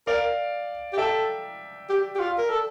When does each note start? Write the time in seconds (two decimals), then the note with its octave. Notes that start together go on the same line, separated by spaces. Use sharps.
0.07 A#4 D5 F5
0.93 G4
0.98 A4 E5 G5
1.89 G4
2.15 G4
2.20 F4
2.38 A#4
2.50 A4